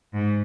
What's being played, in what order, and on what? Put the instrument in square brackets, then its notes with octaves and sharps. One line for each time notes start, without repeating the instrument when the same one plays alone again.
[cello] G#2